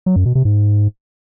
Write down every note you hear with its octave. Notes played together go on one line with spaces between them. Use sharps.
F#3
F#2
B2
C3
G#2